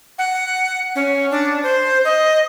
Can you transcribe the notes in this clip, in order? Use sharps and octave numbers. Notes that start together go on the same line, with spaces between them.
F#5
C#4
D4
C5
D#5